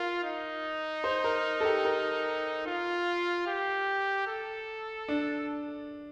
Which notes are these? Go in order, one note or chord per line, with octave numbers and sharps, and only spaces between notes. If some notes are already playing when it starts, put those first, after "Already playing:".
Already playing: F4 A#4
D#4
C5
A#4
A4
G4
A#4
F4
G4
A4
D4